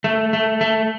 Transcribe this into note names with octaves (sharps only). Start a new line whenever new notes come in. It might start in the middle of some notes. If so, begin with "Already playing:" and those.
A3
A3
A3